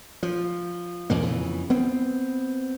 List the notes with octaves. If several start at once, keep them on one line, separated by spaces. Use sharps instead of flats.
F3
A#1 E2 A#2 A#3
F2 C#3 E3
B3 C4